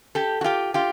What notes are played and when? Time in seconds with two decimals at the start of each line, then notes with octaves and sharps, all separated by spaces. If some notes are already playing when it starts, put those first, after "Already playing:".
0.15 G4 A4
0.41 F#4
0.44 F4 G4
0.74 F4 G4